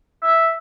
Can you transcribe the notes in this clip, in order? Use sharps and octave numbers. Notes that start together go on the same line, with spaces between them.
E5